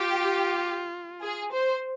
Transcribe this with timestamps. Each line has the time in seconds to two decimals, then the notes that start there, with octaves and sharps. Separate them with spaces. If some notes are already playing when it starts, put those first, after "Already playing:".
Already playing: F4 G4
1.22 G#4
1.52 C5